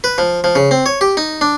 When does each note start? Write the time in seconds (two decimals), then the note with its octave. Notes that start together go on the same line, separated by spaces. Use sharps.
0.04 B4
0.18 F3
0.44 F3
0.55 C#3
0.71 C4
0.86 C#5
1.01 G4
1.17 D#4
1.41 D4